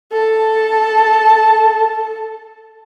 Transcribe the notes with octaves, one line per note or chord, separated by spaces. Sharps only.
A4 A5